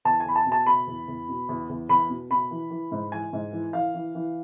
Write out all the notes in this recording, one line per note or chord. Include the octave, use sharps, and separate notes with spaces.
E2 A5
G#5
E2 B5
A5
B2
A5
B2 B5
E2
E2
B2
E2
E2
E2 B5
B2
B2 B5
E3
E3
G#2
E3 G#5
G#2
E3
E3 F5
E3
E3